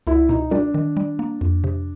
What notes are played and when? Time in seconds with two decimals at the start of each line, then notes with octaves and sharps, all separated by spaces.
0.07 C#2 E4
0.29 B2 D#4
0.51 G3 D4
0.74 D#3
0.97 G3
1.19 A#3
1.41 F2
1.64 C3